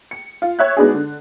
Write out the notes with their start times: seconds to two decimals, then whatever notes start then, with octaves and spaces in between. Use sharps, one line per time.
0.11 C#7
0.42 F4
0.59 C#5 E5 F#6
0.77 G#3 B3 D4 D#4 F#4 G#4
0.94 D3